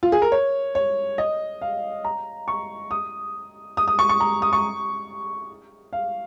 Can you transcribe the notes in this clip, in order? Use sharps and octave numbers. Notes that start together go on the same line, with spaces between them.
F4
G#4
A#4
C#5
C#5
D#5
F5
A#5
C#6
D#6
D#6
D#6
C#6
C#6
A#5
D#6
C#6
F5